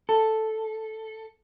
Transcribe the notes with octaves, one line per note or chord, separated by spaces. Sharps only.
A4